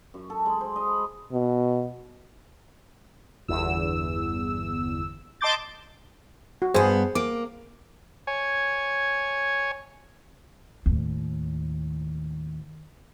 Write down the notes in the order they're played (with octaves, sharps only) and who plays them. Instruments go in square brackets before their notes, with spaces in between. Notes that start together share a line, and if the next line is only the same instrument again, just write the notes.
[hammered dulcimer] F#2
A4
G#3
C5
D#5
B5
[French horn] B2
[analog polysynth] G1 E2 E6
D#5 A5 C6 D6 G6 A6
[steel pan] F#4
[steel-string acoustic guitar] G2 B3 [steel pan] G#4 C5 G#5
[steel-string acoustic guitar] A#3 [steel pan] D6
[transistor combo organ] C#5 G#5
[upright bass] D#2 A2